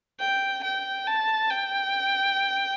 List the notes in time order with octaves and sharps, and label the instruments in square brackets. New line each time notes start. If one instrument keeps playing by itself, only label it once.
[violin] G5
G5
A5
G5